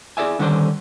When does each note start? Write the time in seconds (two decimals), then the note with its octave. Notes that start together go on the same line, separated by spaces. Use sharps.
0.17 E4 G#4 A4 D5 E5 G#5
0.39 D3 D#3 G3 C#4 D4 C5